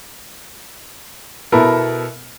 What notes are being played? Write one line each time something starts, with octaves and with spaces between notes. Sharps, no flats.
B2 B3 E4 A4 A#4